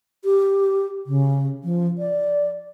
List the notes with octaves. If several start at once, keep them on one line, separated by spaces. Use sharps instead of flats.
G4
C#3
F3
D5